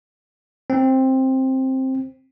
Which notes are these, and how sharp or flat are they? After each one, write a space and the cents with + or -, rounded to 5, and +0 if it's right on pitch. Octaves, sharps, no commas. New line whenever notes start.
C4 +10